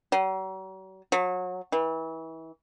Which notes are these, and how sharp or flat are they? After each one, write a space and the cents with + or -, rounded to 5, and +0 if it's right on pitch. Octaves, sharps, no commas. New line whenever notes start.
F#3 +45
F#3 -30
E3 -30